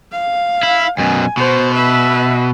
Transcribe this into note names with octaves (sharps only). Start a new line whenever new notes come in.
F5
E4
F#2 B2 G#5
B2 C5
B4 E5